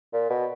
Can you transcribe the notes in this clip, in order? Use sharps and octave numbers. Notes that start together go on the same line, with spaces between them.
A#2
B2